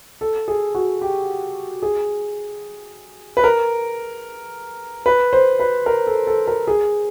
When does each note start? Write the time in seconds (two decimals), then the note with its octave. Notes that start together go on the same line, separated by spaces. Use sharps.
0.21 A4
0.48 G#4
0.75 F#4
1.02 G4
1.82 G#4
3.37 B4
3.44 A#4
5.06 B4
5.33 C5
5.59 B4
5.86 A#4
6.07 A4
6.27 A4
6.47 A#4
6.67 G#4